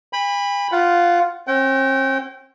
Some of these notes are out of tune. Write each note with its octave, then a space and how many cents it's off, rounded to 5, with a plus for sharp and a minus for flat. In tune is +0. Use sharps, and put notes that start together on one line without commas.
G#5 -45 B5 +0
F4 +0 F#5 +15
C4 +45 G5 -30